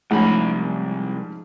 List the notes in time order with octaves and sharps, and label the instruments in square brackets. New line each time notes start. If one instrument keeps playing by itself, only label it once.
[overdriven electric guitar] C2 B5 [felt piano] G#2 F3 C#4 [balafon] A3 A#3